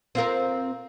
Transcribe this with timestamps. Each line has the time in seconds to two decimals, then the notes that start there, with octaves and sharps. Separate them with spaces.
0.15 C4 F4 A#4